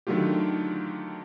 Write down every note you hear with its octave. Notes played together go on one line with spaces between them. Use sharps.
D3 D#3 F#3 A3 F4 G4